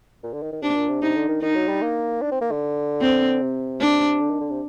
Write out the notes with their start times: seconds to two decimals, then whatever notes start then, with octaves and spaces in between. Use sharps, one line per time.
0.23 A#2
0.33 D3
0.42 D#3
0.53 D#3
0.62 C3 D4
0.76 A#2
0.89 C3
1.02 C3 D#4
1.15 D3
1.29 D#3
1.42 D#3 D#4
1.55 F#3
1.69 G3
1.82 A#3
2.22 D4
2.32 C4
2.41 A#3
2.51 D3
3.01 C4
3.41 C3
3.80 D4
4.20 D3
4.30 D#3
4.41 D3
4.50 C3